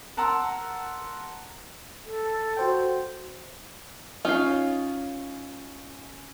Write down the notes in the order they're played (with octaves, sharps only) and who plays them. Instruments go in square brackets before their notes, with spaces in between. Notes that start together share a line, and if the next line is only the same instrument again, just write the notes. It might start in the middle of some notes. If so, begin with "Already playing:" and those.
[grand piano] A#4 F#5 A5 A#5 C6 E6
[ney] A4
[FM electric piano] F#4 C5 G5
[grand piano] C#4 C#5 C7 [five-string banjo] D#4 F4